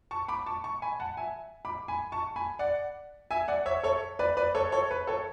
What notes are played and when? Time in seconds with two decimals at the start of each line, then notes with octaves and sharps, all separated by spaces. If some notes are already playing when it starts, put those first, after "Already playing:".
0.11 A5 C#6
0.28 B5 D6
0.46 A5 C#6
0.64 A5 C#6
0.82 G#5 B5
1.00 F#5 A5
1.17 E5 G#5
1.65 B5 D6
1.88 G#5 B5
2.12 A5 C#6
2.36 G#5 B5
2.59 D5 F#5
3.31 E5 G#5
3.48 D5 F#5
3.66 C#5 E5
3.83 A4 C#5
4.19 B4 D5
4.37 B4 D5
4.55 A4 C#5
4.72 A4 C#5
4.91 B4
5.07 A4 C#5